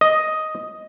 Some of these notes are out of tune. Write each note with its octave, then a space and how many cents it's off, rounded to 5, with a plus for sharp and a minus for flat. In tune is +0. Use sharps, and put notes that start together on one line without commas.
D#5 +5